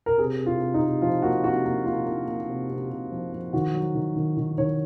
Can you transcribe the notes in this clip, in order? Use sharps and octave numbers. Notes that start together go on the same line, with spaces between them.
A#4
C3 G#4
C3
F4
C3
D#4
C3
F3 F4
A#3 F#4
C3 F#4
A#3
A#3 F4
A#3
A#3
C3
C3
C3
F3
F3
D#3 F#4
F#3
D#3
D#3
D#3
D#3 C#5